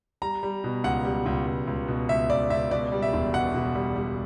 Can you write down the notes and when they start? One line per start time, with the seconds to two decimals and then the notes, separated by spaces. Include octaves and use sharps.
0.22 G3 A#5
0.43 G3
0.64 B2
0.84 C#2 F#5
1.05 G3
1.26 C#2
1.47 C#2
1.67 C#2
1.88 B2
2.09 C#2 E5
2.30 C#2 D5
2.50 C#2 E5
2.71 B2 D5
2.92 G3
3.02 E5
3.13 E1
3.34 B2 F#5
3.55 B2
3.75 G3
3.96 G3